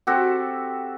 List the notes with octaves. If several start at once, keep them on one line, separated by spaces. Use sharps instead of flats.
C4 F#4 G4 A4